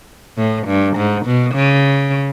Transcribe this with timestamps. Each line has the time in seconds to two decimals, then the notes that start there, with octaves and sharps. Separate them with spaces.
0.38 A2
0.67 G2
0.96 G#2
1.26 B2
1.55 C#3